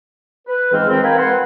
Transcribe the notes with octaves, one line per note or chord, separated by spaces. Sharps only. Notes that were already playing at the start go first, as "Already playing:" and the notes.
B4
C#2 G#2 E3 G#3 C4 F5
D#3 F3 G#3 C4
A#4 B4 F5 G5 G#5 B5
B4 F#5 C6